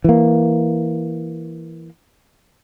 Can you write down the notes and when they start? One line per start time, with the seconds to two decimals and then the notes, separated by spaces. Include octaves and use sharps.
0.04 E3 A#3